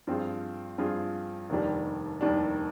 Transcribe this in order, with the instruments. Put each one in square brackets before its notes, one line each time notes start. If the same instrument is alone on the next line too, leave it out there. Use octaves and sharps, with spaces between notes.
[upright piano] G2 F3 C4 F4 G#4
G2 F3 C4 F4 G#4
F1 D#2 D#3 G3 D4
F1 D#2 D#3 G3 D4